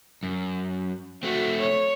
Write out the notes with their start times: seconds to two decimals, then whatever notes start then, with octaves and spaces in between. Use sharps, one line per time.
0.23 F#2
1.23 A3 C4 F#4
1.59 C#5